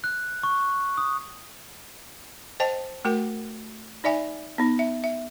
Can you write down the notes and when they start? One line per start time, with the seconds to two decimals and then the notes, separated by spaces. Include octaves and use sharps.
0.04 F#6
0.43 C#6
0.98 D#6
2.60 C5 D#5 G5 A5
3.05 A3 F#4 A#4 G5
4.04 D#4 D5 E5 G#5
4.58 B3 D#4
4.79 E5
5.04 E5